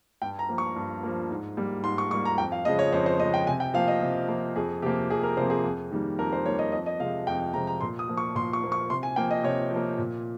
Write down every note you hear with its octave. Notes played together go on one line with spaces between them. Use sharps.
G2 G5
A#5
F3 A#3
C#6
G2
F3 A#3
G#2
G3 A#3
G#2 C6
C#6
G3 A#3 C#6
A#5
F2 G5
F5
C#3 F3 G#3 D#5
C#5
F2 C5
C5
C#3 F3 G#3 D#5
G5
C3 G#5
G5
F3 A#3 F5
D#5
C3
F3 A#3
F2 G#4
C3 F3 A#3 G4
F2 G#4
A#4
C3 F3 A#3 C5
G#4
F2
D#3 G3 A#3
F2 A#4
C5
D#3 G3 A#3 C#5
D#5
F2 D#5
D#5
C3 F3 G#3 F5
F2 G5
C3 F3 G#3 A#5
A#5
A#2 C6
D#6
F3 A#3
C#6
A#2 C6
C#6
F3 A#3
C#6
C3 C6
G#5
F3 A#3 G5
D#5
C3 C#5
F3
A#3
A#2